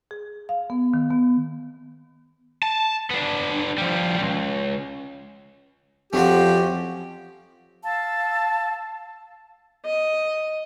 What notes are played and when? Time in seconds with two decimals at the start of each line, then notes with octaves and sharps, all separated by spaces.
0.11 G#4
0.49 F5
0.70 B3
0.94 D#3
1.11 B3
2.63 A5
3.10 B3 D4
3.78 F3 G3
4.20 C#2
6.13 F2 F3 C#4 F#4 G4
7.83 F5 A5 E6
9.86 D#5